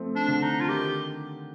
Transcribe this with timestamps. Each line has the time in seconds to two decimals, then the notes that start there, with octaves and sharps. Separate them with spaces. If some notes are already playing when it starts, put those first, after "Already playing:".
Already playing: F3 A3 C4
0.15 D4
0.28 D3
0.42 D#4
0.61 F4
0.68 D#3 G4